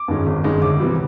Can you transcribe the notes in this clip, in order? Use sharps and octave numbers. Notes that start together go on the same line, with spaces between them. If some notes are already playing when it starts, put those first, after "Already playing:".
Already playing: D6
G2 D#3 G#3 C#4
G#1
G2 D#3 G#3 C#4
D2 D6
C3 E3 G3